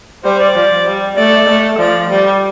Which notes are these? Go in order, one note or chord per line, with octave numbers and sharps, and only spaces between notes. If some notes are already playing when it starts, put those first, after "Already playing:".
G3 C5
D5
F3
G3
A3 D5
A3
F3 D5
G3 D5